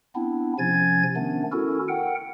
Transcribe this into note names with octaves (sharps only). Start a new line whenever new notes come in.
B3 C4 D4 E4
C3 F3 C#4 G#5 G#6 A6
D#3 A3 B3 C#4 D4
C#4 E4 F#4 A4 A#4
A#4 F#5 G5